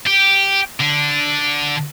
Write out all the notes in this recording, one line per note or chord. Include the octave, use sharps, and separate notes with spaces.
G4
D3 D4